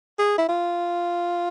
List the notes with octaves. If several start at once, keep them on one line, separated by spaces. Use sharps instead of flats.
G#4
E4
F4